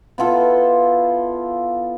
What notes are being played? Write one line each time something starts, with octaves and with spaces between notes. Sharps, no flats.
B3 E4 F4 A4